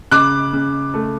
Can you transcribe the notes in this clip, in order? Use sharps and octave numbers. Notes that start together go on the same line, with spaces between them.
C#3 D6 F#6
C#3
A3